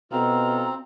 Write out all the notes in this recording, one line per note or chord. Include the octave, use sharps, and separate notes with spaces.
B2 C4 E4 F4 A4 A#5